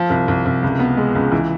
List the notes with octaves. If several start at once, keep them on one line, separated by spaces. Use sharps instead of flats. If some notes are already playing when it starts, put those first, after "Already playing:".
Already playing: F3
C2
C2
C2
C#2
B3
G#3
C#2
E3